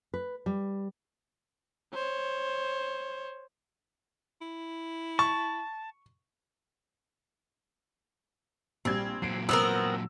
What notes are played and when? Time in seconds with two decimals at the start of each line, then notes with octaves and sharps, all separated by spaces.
0.14 B4
0.46 G3
1.94 C5 C#5
4.42 E4
5.19 A5 C#6
8.85 A#1 G3 C4 G#6
9.22 A#2 F#3 C7 D7
9.49 B3 C4 A#4 E6